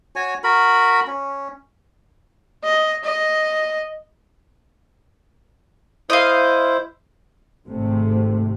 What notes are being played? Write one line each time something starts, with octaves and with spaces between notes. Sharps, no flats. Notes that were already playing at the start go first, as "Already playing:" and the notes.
F#4 C#5 G#5
F#4 A#4 B5
C#4
D#5
D#5
E4 C5 D#5 F5
G#1 G#2 C3 A3